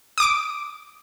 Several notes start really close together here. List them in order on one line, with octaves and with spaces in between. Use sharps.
D#6 D6 D7